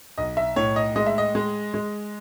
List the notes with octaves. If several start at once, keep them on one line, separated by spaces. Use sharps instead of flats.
B1 D#5
E5
A2 C#5
D#5
G#3 D#5
E5
D#5
G#3
G#3